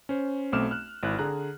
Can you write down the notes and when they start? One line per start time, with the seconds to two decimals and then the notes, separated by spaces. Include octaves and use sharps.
0.09 C#4 C5
0.53 B1 A3 C4 D6 F6 E7
0.71 F6 F#6
1.03 G#1 E4 F#6
1.19 D3 G#4 A#5 F#6